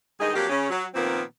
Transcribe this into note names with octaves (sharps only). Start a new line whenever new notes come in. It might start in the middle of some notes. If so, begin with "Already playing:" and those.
G2 D#3 G#3 D#4 G#4 D#5
F2 F#3 A#3 G4
C#3 C#4
F#3
A#2 D#3 F3 B3 C4